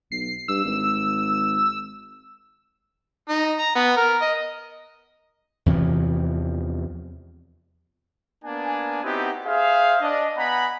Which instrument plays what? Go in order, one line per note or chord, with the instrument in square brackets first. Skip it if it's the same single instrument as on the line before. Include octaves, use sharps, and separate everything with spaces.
[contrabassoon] B1 [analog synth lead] C7
[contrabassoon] G2 [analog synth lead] E6
[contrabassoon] G#1
[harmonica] D#4
A#5
B3
A#4
D#5
[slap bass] E2 C3 E3 F3
[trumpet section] A#3 B3 D4 G#5
B3 C4 D#4 E4 F#4 G4
G#4 C5 E5 F5
D4 D#5
B3 F#5 G#5 A#5 B5